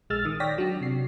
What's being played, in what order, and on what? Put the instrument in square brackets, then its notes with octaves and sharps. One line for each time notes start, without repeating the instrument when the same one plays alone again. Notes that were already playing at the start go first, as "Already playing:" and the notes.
[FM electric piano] A#1 G#3 E6 F6 A6
D#3 D#6
C#5 D5 G5 A#6 B6
F#3 D4
C3 C7